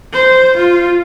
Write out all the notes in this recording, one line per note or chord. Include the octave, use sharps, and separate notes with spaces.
C5
F4